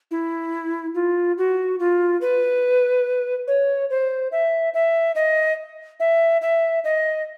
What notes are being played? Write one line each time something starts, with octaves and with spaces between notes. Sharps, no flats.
E4
F4
F#4
F4
B4
C#5
C5
E5
E5
D#5
E5
E5
D#5